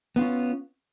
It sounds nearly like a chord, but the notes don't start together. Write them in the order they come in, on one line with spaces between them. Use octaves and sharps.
B3 F4 C#4